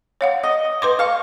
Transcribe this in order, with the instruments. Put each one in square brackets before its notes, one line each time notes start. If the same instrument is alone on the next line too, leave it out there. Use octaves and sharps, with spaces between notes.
[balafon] C#5 F5 F#5
[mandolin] D#5
[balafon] B4 C6 D6
[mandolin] F5 C#6